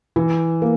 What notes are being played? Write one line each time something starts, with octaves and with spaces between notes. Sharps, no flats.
E3
A#3